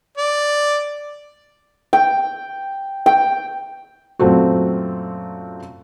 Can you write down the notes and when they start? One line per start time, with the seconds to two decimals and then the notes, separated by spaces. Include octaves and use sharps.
0.18 D5
1.93 G5
3.06 G5
4.19 F#2 A#2 A3 C4 F#4